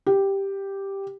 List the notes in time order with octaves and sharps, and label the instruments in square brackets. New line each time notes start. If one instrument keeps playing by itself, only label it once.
[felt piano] G4